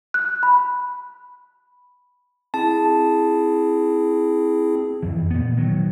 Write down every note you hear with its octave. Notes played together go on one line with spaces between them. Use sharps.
F#6
B5
C4 E4 G#4 A5
F2 E3
A#2 B3
D#3 F#3